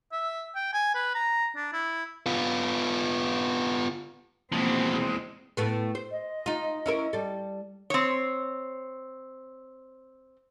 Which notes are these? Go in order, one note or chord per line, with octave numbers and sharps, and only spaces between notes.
E5
G5
G#5
B4
A#5
D4
E4
B3 F4
E2 B2 F3 G#3 A#3 C4
A2 A3 B3
C5
D#5
D#4 F4
C#4 E4 A#4
G3 A4
C4 C#5